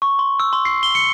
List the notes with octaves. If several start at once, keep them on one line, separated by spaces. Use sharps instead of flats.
C#6
C6
E6
C6
C7
G7
C#7